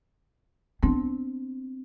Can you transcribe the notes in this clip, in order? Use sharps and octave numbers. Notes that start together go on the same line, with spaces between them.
B3 C4 D4